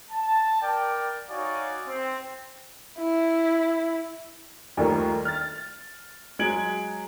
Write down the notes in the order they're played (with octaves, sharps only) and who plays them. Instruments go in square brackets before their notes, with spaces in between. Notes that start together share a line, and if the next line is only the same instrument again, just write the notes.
[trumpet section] A5
A#4 D5 G5
D#4 F#4 C#5 D5 F5 G#5
C4
[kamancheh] E4
[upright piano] D#2 D#3 F3 G3 A3 A#3
F6 A6
F#3 G#3 G#6 D7 F#7